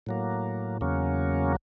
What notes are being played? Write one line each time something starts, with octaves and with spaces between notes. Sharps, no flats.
A2 F#3 A#3
E2 C#3 F#3 A#3 C#4